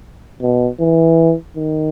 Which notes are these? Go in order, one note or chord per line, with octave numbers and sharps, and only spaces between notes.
B2
E3
D#3